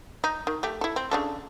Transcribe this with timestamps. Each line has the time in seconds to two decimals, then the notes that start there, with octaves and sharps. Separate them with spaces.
0.24 D#4
0.47 D#3
0.63 A3 G4
0.81 E4 A4
0.96 C4
1.11 C#3 D4 A4